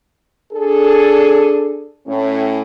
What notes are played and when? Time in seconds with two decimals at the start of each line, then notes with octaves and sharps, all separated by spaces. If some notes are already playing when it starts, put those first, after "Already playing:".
0.52 D4 G#4 A4
2.07 A2 C#4